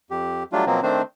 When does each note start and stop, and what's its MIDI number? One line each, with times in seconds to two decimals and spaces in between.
0.11 0.43 41
0.11 0.43 67
0.52 0.65 54
0.52 0.65 55
0.52 0.65 57
0.52 0.65 62
0.52 0.65 65
0.66 0.80 47
0.66 0.80 53
0.66 0.80 54
0.66 0.80 58
0.66 0.80 60
0.83 1.02 51
0.83 1.02 57
0.83 1.02 60
0.83 1.02 62
0.83 1.02 72